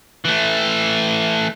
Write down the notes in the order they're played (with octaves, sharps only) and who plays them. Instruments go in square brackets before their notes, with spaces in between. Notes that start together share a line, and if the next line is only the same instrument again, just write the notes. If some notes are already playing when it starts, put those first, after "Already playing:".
[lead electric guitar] E3 A3